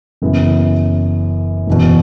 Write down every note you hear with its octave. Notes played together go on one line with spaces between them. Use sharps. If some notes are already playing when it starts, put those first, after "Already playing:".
F#1 F#2 C#3 E3 B3
F#1 E2 B2